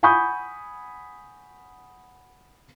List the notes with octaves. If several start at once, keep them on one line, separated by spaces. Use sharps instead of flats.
F#5 G#5 B5 C#6 D#6 G6